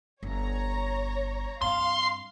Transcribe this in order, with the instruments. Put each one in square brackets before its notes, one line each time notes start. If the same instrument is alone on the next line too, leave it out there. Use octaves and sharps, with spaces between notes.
[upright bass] G1 [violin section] C#5 A#5
[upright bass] G2 C4 [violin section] F5 [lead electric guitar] C6